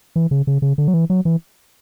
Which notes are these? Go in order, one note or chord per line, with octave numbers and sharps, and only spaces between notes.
E3
C#3
C#3
C#3
D3
F#3
E3
F#3
E3